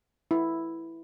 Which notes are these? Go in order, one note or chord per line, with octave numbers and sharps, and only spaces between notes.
E4